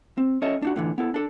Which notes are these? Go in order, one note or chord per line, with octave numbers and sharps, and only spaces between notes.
C4
C#4 A4 C#5 D#5 E5
D4 D#4 F#4
A2 D3 E3
B3 E4 A4
D4 A4